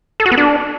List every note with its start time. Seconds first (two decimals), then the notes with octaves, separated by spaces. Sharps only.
0.20 A4
0.26 F#4
0.32 B3
0.38 D4